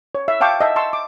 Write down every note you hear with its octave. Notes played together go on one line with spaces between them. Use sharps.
C#5
E5
E5 F5 G5 A5 C#6 D6
D#5 E5 A5
A5 C6 C#6 E6
D6